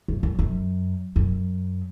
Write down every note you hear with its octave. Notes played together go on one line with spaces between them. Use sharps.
F#2
F#2
F#2
F#2